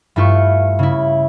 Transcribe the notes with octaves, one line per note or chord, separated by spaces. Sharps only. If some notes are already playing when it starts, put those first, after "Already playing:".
G2 A3 E4 F4 C#6
C#3 E4